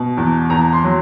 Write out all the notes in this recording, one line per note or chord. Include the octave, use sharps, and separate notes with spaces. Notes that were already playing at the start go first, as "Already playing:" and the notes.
Already playing: B2
E2
E2 A#5
C6
F#3